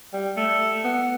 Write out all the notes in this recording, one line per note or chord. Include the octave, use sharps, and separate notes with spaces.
G3
A3
B3